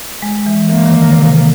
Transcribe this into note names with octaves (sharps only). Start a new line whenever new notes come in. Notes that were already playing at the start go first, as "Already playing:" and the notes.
G#3
E3
E3 A#3
D#3
D3
C3